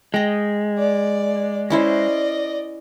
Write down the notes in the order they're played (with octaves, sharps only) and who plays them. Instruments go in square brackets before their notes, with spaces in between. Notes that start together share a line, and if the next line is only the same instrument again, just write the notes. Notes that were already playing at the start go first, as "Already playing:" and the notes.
[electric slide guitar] G#3 [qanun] D#5 G5
[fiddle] D5
[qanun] C#4 E4 C5 [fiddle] D5 D#5